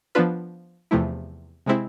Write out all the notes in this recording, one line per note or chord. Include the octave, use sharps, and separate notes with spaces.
F3 B3 D4 F4 B4
E2 C3 F3 A3 E4
C3 G#3 C4 E4